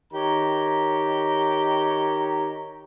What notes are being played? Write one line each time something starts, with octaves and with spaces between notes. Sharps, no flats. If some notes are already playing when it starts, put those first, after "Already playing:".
D#3 G4 C#5 A#5